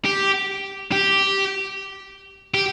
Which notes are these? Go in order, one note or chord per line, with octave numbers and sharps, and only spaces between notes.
G4
G4
G4